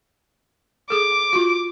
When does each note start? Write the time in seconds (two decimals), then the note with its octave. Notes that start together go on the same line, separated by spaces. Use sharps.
0.90 G#4 A4 D6
1.33 F4 F#4